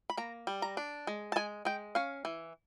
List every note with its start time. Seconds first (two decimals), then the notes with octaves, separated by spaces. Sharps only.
0.10 B5
0.17 A#3 A#5
0.47 G3
0.62 A#5
0.77 D4
1.07 G#3
1.32 A5
1.36 G#3 G#5
1.65 G#3 G5
1.95 C#4 F5
2.25 E3